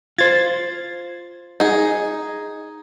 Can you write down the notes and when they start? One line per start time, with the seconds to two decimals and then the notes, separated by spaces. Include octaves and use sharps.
0.18 F4 C5 G#6 A6
1.60 D#4 G#4